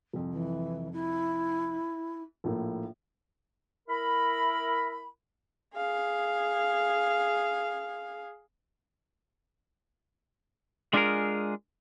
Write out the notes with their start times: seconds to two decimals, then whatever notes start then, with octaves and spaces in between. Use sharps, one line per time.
0.13 C2 F2
0.32 E3
0.93 E4
2.44 A#1 A2 A#3
3.89 E4 A#4 B5
5.76 G#4 F5
10.93 G#3 D4 F4 F#4 G#4 A#4